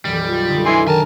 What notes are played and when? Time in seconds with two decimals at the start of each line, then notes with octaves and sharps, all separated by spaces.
0.05 B1 F#2 D#3 E3 G3
0.28 F4
0.48 D3 D#4
0.66 E3 E4 G#5 C6
0.88 D#3 G4 A#4 G#5 A5